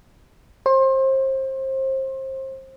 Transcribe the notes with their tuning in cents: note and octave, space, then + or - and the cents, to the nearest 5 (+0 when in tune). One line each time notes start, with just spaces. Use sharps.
C5 +30